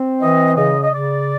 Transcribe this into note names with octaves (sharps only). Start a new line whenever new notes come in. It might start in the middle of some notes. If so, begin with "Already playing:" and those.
Already playing: C4
E3 D#5
C#3 D#5
D#5
C#3 D5